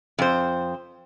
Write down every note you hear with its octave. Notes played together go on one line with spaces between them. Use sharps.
F2 C5